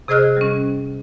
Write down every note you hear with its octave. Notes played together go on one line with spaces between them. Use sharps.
C3 G#4 C5 D#5 F6 F#6
G3 C#4